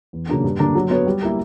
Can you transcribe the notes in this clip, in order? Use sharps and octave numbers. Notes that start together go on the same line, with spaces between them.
E2
C#3 F#3 A#3 D4
G2
D3 A#3 D4
F#3
B3 F#4 C#5
G3
A#3 E4